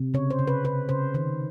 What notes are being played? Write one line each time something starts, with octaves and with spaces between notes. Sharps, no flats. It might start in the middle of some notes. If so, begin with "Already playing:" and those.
Already playing: C3
C#3 C#5
C5
C#3
B4
C#3 B4
C#3 C5
D#3 C5